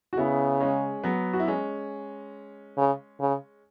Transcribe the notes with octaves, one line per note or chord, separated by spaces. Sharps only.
F#4
C#3 B3 E4
G#3 C#4
F#3 B3
F#4
E4
G#3 C#4
C#3
C#3